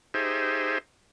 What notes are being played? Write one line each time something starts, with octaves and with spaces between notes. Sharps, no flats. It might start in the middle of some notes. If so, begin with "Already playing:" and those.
D#4 G4 G#4 C5 E5